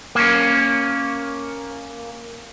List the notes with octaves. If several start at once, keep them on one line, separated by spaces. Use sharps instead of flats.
A#3 C#4